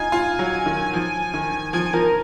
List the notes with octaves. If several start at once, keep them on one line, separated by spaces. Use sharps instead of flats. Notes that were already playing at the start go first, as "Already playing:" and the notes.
Already playing: D#4 F4 G#5
F4
F#3
D#3
F3
D#3
F3 G#5
F3 A#4